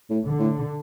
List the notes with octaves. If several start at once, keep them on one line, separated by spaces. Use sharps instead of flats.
A2
D3
A2